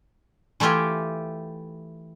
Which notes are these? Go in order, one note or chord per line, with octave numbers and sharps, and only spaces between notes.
E3 A3 E4 F4 G4 G#5